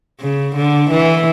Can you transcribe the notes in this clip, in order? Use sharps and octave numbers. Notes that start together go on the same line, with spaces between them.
C#3
D3
E3